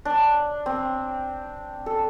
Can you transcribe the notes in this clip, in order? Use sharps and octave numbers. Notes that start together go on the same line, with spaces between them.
D4
C4
A4